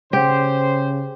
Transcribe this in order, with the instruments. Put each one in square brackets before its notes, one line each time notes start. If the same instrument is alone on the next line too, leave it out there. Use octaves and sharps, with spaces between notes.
[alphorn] C#3 [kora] G4 [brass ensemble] C5